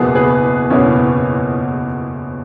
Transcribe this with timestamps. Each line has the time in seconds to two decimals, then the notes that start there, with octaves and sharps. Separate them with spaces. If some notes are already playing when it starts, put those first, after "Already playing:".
Already playing: F#1 E2 B2 G#4 B4
0.15 G#4 B4
0.70 F#1 E2 B2 C#4 E4